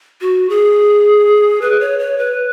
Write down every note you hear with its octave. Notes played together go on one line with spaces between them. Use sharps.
F#4
G#4
B4
C#5
C#5
B4